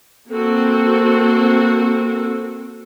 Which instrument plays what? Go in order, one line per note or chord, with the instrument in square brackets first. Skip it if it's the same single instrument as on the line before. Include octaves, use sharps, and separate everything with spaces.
[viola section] A#3 C4 F#4 [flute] A4